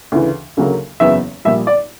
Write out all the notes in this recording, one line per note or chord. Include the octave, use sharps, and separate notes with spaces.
D2 C#3 E3
D2 C#3 F#3 A#3
F#1 E2 C#3 F#3 B3 E5
A#1 A#2 G3 E5
D5